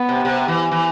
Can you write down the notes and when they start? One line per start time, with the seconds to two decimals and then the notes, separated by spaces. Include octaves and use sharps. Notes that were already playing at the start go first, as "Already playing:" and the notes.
Already playing: B3
0.09 C3
0.25 C3
0.48 E3
0.71 E3